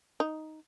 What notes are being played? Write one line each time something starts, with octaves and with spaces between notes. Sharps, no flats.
D#4